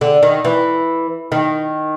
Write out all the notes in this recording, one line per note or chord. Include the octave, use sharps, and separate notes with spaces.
D3
D#3
E3
D#3